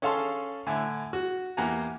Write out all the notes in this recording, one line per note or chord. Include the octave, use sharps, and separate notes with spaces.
C#4 G#4 A4 F5 A5 C6
A2 D3 E4 G#5
F#4
E2 A#3 G4 F#5 G#5 A#5